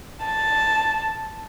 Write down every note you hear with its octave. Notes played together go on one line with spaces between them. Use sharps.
A5